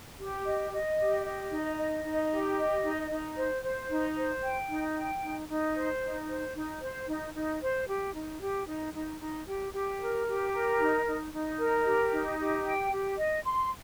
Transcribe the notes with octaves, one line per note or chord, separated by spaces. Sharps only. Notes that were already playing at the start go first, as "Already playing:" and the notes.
G4
D#5
D#5
G4
D#5
D#4
D#5
D#4
G4
D#5
D#4
D#4
C5
C5
D#4
C5
G5
D#4
G5
D#4
D#4
C5
D#4
C5
D#4
C5
D#4
D#4
C5
G4
D#4
G4
D#4
D#4
D#4
G4
G4
A#4
G4
A#4
D#4
D#4
D#4
A#4
G4
D#4
G4
G5
G4
D#5
C6